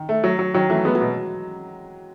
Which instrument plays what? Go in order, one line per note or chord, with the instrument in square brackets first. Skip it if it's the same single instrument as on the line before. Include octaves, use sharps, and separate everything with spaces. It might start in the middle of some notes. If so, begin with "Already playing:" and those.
Already playing: [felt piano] D#3
[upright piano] A3
F#3
F#3
[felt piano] D#3 [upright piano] F#3
[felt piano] E3 [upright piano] A3
[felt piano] G#3 [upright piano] B3
[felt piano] F#3
[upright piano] B2